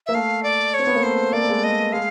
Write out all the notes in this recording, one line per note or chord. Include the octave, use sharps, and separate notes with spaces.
A#3 E5
A3 F5
D5
C#5
C4
B3
A#3
A3 C5
A#3 D5
A3
G#3 A#3
A3 D#5
G#3 F5